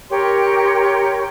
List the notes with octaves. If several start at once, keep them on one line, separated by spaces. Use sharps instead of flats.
G4 A#4 C#5 C6